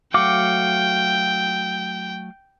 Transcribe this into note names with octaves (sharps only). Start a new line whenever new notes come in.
F#3 A3 F#4 F5 G5 D6